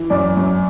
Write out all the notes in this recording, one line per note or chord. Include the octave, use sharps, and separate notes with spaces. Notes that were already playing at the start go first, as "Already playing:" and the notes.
Already playing: E3
F#2 D5
F#2